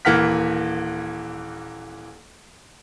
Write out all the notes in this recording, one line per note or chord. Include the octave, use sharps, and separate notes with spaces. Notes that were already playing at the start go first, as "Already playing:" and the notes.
D#1 E3 A#3 F#5 F6 B6